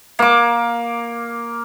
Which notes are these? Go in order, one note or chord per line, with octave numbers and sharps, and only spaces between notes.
A#3 D6